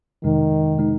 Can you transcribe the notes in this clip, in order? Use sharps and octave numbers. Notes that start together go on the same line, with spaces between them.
F2 C3 D#3 G#3 D#4
C3 G#3 D#4